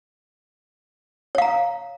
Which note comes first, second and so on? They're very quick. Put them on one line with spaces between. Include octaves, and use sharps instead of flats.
C#5 F5 A#5